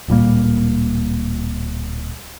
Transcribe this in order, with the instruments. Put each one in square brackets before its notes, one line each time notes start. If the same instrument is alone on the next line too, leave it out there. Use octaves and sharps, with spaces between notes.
[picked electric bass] D1 A#2 G3 A#3